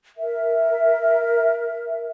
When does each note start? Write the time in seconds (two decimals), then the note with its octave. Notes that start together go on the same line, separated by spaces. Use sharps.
0.17 A#4 E5